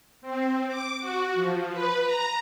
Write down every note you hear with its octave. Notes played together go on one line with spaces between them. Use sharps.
C4
D6
F#4
F3
B4
A#5